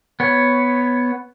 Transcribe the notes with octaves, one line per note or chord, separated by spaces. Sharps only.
B3 C#5